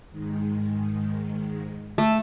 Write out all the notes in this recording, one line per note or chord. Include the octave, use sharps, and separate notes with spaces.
G#2 D#3 G#3
A3